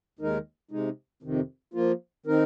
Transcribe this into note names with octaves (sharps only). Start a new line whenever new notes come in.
D#2 D#3 G#3 D#4 A#4
C3 G#3 D#4
F2 C3 D#3
F3 A#3 F4
D#3 C4 D#4 A#4